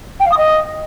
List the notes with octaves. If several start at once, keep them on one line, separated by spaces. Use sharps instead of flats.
G5
F5
D#6
D#5